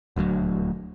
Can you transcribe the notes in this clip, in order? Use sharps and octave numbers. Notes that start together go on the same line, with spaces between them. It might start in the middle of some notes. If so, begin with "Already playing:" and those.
D#1 D2 F3 F#3